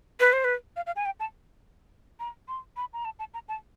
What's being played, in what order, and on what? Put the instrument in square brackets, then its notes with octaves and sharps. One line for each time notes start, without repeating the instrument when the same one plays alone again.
[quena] B4
C5
B4
F5
F5
G#5
G5
A5
A#5
C6
B5
A#5
A5
A5
A#5
A5